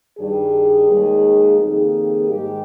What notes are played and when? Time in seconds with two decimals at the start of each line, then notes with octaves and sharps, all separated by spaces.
0.18 G2 D#3 G3 G#4
0.88 D#2 D#3 G#3
1.59 F2 D#3 G3 A#3 G#4
2.29 G#2 D#3 G#3 G4